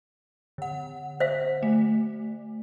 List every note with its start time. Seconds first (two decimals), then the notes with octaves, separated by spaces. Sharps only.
0.58 D3 F#5
1.20 C5 E5 F5
1.63 A3